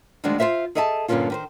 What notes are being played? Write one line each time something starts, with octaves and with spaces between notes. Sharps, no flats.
D2 D#3 F3 G#3 D4
F4 F#4 C5 E5 F5
G#4 A4 D#5 E5 G#5 A5
G2 A#2 D3 A#3 C#4 F4
D#3 B4 C5